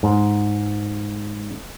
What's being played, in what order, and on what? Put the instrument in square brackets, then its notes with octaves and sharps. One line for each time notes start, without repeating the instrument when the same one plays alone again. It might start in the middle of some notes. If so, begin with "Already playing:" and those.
[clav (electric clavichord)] G#2